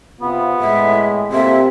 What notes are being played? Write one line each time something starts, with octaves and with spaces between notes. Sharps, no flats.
C3 B3 F4
A2 G#3 E5
C3 A#3 F4 A4 E5